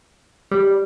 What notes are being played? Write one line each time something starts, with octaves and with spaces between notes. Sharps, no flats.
G3